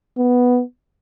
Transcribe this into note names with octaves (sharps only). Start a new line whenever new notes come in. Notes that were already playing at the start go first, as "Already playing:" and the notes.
B3